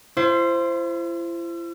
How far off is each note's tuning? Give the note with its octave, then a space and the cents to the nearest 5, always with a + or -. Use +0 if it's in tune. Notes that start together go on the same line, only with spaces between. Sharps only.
E4 +45 C5 +0